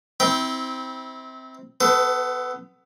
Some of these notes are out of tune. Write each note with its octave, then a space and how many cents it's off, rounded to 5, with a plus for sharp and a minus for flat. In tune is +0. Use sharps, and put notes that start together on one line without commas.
C4 +0 E4 -30 G5 +0
B3 +20 A4 +0 C5 -45